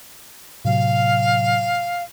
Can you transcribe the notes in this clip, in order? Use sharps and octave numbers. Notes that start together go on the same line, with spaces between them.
A2 C3 F#3 F5